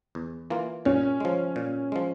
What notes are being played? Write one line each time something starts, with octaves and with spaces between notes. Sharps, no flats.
E2
E3 A#3 F4
A#2 C#4
F3 G#3
A#2
F3 G#3